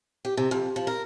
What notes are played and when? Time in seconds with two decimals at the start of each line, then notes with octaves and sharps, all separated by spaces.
0.25 G4
0.37 C3
0.51 F2
0.76 F3
0.87 A#4